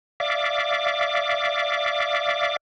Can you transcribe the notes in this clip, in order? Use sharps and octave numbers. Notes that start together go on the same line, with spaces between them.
D5 E5 F5 D6